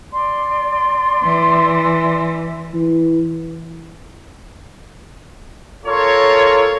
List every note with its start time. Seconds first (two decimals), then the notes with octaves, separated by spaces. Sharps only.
0.12 D5 C6
1.23 E3
2.74 E3
5.86 F4 A4 A#4 C#5